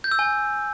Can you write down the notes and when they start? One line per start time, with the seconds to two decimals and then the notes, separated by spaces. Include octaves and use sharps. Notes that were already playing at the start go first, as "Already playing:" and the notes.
0.04 G6
0.12 E6
0.19 G#5